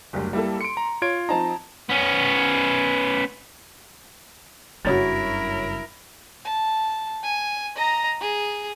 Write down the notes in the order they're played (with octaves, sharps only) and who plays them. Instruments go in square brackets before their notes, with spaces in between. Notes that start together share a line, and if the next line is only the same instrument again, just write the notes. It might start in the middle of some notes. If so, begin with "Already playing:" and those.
[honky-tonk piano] F#1 D2 G3
[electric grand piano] G3 [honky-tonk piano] A#3 E4 A4
[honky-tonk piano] C6 [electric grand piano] C#7 D7
[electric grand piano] A#5
[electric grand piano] F4 G#6 D7 [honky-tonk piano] C#5
[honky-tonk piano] F3 C4 D#4 [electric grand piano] A5 A#5
[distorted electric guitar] B3 C#4
[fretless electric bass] F#1 G2 C#3 [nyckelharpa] E4 [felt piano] F#4 C#5 A6 [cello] A#4
[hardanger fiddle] A5
G#5
D#5 A#5
G#4